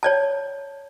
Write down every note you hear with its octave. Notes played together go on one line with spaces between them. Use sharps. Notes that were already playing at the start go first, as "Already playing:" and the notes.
C#5 D5 A5